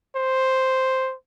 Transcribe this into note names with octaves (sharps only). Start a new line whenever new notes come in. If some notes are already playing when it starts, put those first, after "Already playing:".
C5